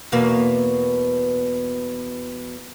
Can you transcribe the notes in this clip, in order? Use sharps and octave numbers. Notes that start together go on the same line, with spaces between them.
E2 B2 A#3